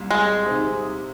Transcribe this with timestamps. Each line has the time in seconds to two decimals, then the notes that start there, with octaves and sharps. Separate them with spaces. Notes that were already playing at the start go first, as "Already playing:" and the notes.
Already playing: C2 A#2
0.11 G#3
0.46 C3 D#3